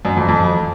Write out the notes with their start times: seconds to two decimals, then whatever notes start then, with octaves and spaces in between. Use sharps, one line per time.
0.05 F#2
0.17 F2
0.28 F2